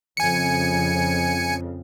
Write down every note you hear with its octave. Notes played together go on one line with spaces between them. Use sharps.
F2 C#3 G#5 C#7